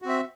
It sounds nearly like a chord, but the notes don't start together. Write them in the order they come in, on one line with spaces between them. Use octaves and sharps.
F#4 C4 E5